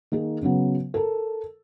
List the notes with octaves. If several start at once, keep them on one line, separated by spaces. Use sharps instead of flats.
D#3 A#3 D#4 G#4
C#3 F#3 B3
A4 A#4